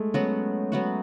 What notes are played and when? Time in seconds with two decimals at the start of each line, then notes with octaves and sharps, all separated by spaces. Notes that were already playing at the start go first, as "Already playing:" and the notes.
Already playing: G#3 A3
0.14 F#3 B3 C#4 F#4
0.72 F#3 B3 F#4